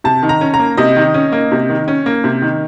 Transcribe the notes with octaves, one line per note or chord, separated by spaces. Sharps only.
C3 A5
D#3
A#5
C#4
A#5
A#3
C3 D#5
D#3
C#4
A#3
C3
D#3
C#4
A#3
C3
D#3